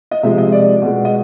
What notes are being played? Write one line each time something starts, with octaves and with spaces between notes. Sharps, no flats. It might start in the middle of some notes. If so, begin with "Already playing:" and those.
D#5
C3 F3 G#3 E5
D#5
D5
B2 G#3
D#5